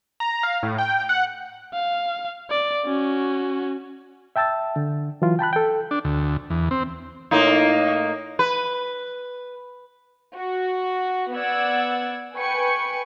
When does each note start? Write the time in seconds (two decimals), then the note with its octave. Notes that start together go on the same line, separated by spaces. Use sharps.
0.20 A#5
0.43 F5
0.63 A2
0.78 G5
1.09 F#5
1.74 F5
2.51 D5
2.86 C#4 F#4
4.36 E5 G5 A5 E6 A6
4.76 D3
5.22 E3 F#3 F4
5.39 G5 A5 B5 F#6
5.53 A4 G5
5.91 D4
6.04 D2
6.50 E2
6.71 C4
7.31 A2 A#3 D#4
8.39 B4
10.37 F#4
11.36 B3 D5 F#5 E6 G#6
12.36 B4 G5 G#5 C#6 C#7